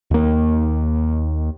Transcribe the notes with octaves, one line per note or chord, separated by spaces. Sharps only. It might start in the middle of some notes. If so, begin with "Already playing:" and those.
D#2 A#3